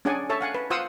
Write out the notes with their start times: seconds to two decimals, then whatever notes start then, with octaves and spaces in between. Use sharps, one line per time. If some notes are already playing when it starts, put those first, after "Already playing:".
0.05 C#4 D4 G#4 D5 F#5 G#5
0.29 A4 C#5 E5 A5
0.41 F5 F#5 G#5
0.55 B4
0.70 F4 C5 F5 F#5 D#6 E6